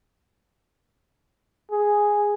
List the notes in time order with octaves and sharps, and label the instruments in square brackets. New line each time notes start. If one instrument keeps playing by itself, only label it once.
[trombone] G#4